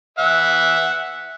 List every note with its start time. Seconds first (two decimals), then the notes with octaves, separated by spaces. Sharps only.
0.18 E5 F#5